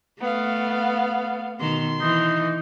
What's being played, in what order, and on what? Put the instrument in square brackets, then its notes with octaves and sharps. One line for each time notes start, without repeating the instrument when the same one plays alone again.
[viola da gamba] A3 [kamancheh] B3 F5
[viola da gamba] B2 D#3 [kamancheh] C6
[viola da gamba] E3 [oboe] D#4